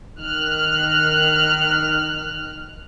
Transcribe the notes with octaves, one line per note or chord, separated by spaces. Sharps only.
D#3 F6 F#6